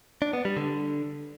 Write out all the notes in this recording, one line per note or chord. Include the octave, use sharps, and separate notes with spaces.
D4
B3
G3
D3